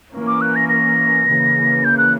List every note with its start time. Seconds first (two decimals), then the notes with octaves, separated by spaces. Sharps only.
0.12 E3 A#3 C#4
0.27 D6
0.41 F#6
0.56 A#6
0.69 A#6
1.27 C#3 E3 A#3
1.85 G6
1.98 F#6